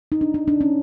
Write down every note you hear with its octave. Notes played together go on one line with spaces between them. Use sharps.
D#4
D4
D#4
D4
C#4